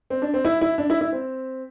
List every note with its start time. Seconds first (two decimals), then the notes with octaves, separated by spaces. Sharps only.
0.10 C4
0.22 D4
0.34 C4
0.44 E4
0.61 E4
0.78 D4
0.90 E4
1.01 E4
1.12 C4